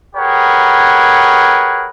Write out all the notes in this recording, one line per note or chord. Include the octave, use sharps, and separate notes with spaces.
G4 G#4 A#4 B4 C#5 F#5